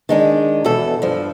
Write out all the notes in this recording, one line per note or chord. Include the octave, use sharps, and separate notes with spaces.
D#3 G#3 D4
E2 B2 A4
G2 F3